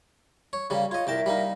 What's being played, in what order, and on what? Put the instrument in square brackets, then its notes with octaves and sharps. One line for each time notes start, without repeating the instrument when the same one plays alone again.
[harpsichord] C#5
C#3 G3 A#3
[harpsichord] F4 D#5 [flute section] C#5 G#6
[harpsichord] C2 G5 A5 [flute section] A#4 E5
[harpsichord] G3 A#3 D#4